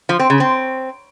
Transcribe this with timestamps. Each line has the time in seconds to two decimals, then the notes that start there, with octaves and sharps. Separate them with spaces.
0.09 F3
0.19 C4
0.30 C#3
0.40 C4